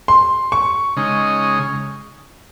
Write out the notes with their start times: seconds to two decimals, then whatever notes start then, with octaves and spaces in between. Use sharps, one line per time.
0.08 C6
0.52 C#6
0.96 C#3 G#3 D#4